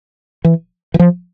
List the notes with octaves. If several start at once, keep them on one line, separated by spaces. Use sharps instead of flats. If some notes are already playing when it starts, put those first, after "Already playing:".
E3
E3
F3